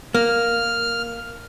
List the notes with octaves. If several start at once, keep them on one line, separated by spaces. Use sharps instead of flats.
A#3 F6